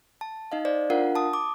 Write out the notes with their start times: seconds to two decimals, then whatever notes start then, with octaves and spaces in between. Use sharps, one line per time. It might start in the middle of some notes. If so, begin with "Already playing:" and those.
0.21 A5
0.52 D#4 D#5 F5
0.65 C5 D5
0.90 D4 F4 A#4 F5 F#5
1.15 A5 D#6
1.33 D6